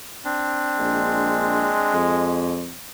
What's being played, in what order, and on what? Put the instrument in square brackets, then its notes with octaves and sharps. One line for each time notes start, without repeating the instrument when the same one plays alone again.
[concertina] C4 D4
[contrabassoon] A#1 [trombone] G#3
[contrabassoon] F2